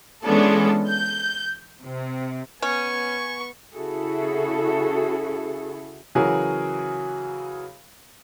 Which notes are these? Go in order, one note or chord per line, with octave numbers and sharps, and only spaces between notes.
E3 G#3 B3 C#4 D4 A4
G6
C3
B3 C#4 G#5 C#6
C#3 E4 F#4 G#4 A4
C#3 E3 F#3 F#4 G#4 A#4